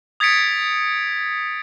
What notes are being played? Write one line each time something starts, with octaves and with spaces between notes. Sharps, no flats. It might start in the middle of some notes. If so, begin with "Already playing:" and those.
D#6 G#6 A6 B6 C#7 D7